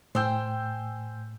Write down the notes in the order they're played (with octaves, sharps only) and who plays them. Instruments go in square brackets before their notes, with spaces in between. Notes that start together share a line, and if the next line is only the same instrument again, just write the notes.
[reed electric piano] A2 [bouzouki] C5 G5 [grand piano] G#5 E6 G6